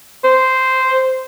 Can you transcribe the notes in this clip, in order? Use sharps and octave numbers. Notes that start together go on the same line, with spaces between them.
C5